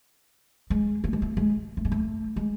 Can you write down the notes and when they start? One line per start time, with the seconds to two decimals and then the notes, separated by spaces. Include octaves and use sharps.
0.70 G#3
1.04 A3
1.13 G#3
1.22 A3
1.37 G#3
1.77 A3
1.85 G#3
1.92 A3
2.36 G#3